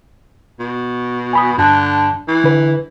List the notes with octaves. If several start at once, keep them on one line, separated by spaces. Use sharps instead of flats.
B2
G#5 B5 D#6
G2 D3 A5 F#6
E3
D3 B4